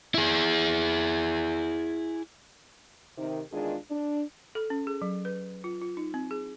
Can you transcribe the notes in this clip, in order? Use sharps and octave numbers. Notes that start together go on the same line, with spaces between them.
E4 G#4
C3 D#3
E2 D#3 G#3 D4 F4 G#4
D4
A4
C#4
G#4
F#3
B4
F4
F4
D#4
C4
G#4